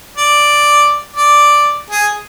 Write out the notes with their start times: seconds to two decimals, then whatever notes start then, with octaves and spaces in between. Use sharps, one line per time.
0.17 D5
1.16 D5
1.90 G#4